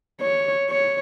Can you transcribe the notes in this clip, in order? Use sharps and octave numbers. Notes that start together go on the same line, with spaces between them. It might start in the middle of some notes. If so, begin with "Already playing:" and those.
C#5
C#5